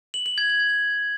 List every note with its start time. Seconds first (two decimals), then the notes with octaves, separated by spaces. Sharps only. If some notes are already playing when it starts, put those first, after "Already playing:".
0.14 F#7
0.26 F#7
0.38 G#6
0.50 G#6